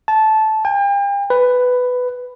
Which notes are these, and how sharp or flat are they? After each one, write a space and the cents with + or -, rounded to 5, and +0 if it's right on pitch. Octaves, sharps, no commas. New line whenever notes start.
A5 -15
G5 +40
B4 +10